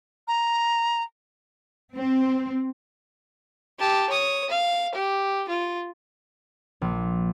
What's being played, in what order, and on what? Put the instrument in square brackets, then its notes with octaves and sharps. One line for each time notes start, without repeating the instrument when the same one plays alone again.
[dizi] A#5
[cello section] C4
[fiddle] G4 A5
C#5 D#6
F5
G4
F4
[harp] A#1